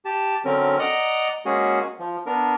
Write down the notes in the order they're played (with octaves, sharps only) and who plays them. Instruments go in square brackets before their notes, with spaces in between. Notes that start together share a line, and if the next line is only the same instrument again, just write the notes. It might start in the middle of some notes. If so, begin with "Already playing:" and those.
[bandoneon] G4 A5
D3 F#3 C4 C#4 A#4
D5 D#5 F#5 A#5
G#3 A#3 C#4 F#4 G#4
F3
B3 D4 A#4